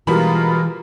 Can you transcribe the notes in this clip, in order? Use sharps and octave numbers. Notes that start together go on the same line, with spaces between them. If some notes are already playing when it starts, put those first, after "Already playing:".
B2 E3 G3 G#3 F4 A#4 B5